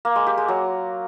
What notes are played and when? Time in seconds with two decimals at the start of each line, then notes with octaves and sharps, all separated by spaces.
0.05 A#3
0.16 G#3
0.27 G4
0.37 G#3
0.48 F#3